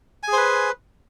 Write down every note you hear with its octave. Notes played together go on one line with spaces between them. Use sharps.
G#4 B4 C5 G#5